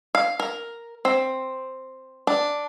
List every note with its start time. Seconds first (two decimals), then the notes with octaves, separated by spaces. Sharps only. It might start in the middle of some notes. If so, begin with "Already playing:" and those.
0.15 F5
0.40 A#4
1.05 C4
2.27 D4